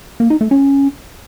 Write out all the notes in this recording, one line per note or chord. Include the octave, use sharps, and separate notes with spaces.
A#3
D#4
A3
C#4